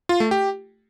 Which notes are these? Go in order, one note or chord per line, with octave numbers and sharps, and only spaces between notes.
F4
A3
G4